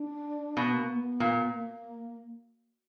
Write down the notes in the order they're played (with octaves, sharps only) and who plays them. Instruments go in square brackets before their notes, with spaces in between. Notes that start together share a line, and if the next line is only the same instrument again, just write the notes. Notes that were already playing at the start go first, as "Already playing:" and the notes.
Already playing: [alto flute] D4
[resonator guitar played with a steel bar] B2 [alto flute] B3
[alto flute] A#3
B3
[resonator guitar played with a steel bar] A#2
[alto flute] A#3